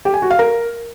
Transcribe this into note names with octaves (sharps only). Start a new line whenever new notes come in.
G4
G#5
F#4
F5
A#4